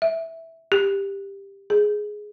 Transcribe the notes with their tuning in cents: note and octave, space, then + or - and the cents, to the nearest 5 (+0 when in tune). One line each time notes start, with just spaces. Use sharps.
E5 -5
G4 +10
G#4 +5